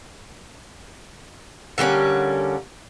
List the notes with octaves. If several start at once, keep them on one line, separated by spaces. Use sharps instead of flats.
D3 G3 A#3 C#4